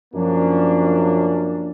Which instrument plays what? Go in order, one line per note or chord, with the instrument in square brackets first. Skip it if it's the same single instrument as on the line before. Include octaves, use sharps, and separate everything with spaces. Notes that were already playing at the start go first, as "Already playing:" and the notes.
[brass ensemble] F#2 F3 A#3 C#4 D4